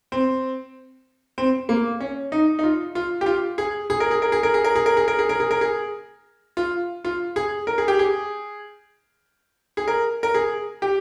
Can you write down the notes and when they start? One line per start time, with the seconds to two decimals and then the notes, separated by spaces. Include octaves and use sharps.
0.12 C4
1.38 C4
1.69 A#3
2.00 C#4
2.32 D#4
2.59 D#4
2.63 F4
2.95 F4
3.21 G4
3.26 F4
3.58 G#4
3.90 G#4
4.00 A#4
4.11 G#4
4.22 A#4
4.32 G#4
4.43 A#4
4.54 G#4
4.64 A#4
4.76 G#4
4.86 A#4
4.97 G#4
5.08 A#4
5.19 G#4
5.29 A#4
5.40 G#4
5.51 A#4
5.61 G#4
6.57 F4
7.05 F4
7.36 G#4
7.67 A#4
7.78 G#4
7.88 G4
7.99 G#4
9.77 G#4
9.88 A#4
10.23 A#4
10.34 G#4
10.82 G4